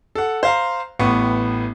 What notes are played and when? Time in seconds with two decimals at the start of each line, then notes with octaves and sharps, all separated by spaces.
0.15 A4 F#5
0.43 C5 F5 A#5
0.99 A1 A2 B3 C#6